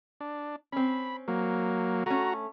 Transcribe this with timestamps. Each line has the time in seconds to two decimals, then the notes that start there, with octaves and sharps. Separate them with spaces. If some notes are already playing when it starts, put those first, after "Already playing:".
0.21 D4
0.72 C4 C#4 B5
1.28 F#3 A#3
2.06 A3 C#4 F#4 A#5